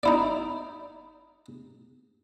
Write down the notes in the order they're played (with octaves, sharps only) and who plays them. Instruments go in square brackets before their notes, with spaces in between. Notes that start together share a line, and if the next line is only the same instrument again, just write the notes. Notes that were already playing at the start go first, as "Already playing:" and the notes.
[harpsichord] D#4 E4 D5